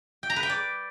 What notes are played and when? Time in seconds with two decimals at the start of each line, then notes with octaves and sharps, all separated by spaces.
0.23 G5
0.30 A#5
0.36 B4
0.43 G5
0.50 D5